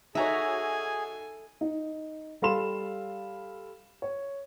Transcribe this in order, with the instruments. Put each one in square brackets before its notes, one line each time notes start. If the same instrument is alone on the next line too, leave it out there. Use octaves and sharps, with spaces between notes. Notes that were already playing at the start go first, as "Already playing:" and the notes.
[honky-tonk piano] D#4 F#4 C#5 [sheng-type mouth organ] G#4 [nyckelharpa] A4 G#5 [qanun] E5 A#5
[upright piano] D#4
G3 A4 F5 B5 C6 E7
C#5